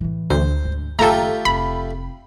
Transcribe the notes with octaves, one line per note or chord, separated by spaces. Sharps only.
A2 E3
D2 C5
G#2 D3
F#1 D#3 A3 F4 G4 A4 A#5
F1 B5